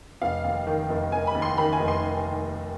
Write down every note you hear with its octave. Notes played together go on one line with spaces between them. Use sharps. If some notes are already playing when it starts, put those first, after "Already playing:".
F1 F5
D#2
D#3
F1
F1 G#5
B5
D#2
C6
D#3 B5
G#5
F1
C6